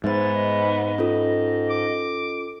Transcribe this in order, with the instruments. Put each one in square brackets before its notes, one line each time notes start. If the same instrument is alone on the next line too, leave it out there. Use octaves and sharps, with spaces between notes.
[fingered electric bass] G#2 [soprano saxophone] B3 [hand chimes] C5 E5 [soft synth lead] A6
[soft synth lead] D#5
[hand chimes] C#4 F4 A4
[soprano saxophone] D6